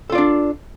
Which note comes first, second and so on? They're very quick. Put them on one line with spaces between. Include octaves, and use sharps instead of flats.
A4 F4 D5 D4